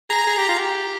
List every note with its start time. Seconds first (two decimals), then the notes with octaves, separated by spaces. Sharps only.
0.10 G#4 A#5
0.27 G#4
0.38 G4
0.49 F4
0.59 G4